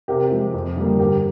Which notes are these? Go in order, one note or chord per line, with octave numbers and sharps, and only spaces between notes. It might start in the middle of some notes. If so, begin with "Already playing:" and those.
C3 G4 A#4
F3 G#3
F2
D3 G3 A#3
G2 G4 A#4